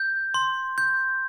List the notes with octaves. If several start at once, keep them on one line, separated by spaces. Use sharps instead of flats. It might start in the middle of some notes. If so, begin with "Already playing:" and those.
Already playing: G6
C6
G6